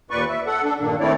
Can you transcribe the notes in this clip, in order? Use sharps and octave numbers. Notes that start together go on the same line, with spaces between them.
D#2 A#2 B4 D5 C#6
E5
A4 F#5
D4 A4
G2 A#2 D#3 A#3 D4
D#3 A3 C4 E4 C#5 D5